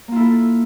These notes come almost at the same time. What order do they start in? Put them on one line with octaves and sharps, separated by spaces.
A#3 F4 E4 A4